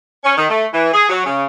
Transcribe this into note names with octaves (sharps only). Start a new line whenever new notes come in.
C#4
D#3
A3
E3
G#4
F#3
C#3